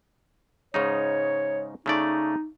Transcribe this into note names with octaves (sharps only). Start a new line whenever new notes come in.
G#2 C#3 D#4 C#5
C#3 A3 D#4 D5